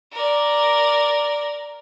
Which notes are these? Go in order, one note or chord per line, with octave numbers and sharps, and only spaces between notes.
A#4 D5